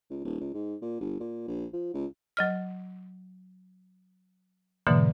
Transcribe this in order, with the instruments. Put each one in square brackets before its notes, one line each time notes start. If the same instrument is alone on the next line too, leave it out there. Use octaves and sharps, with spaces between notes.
[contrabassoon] C#2
D#1
C#2
G#2
A#2
G1
A#2
A#1
F3
C#2
[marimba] F#3 D#5 F6
G#2 B2 D3 E3 F#3 A#3